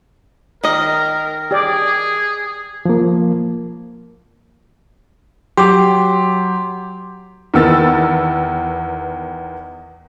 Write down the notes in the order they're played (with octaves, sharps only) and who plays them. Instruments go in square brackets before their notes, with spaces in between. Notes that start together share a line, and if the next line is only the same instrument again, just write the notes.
[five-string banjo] D#3 D#5 [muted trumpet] A#4
[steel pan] G4 D5 [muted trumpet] G#4
[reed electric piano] F3 A#3
[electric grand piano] F#3 G4 [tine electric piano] C6 D6
[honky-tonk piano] E2 D#3 B3 E6 A6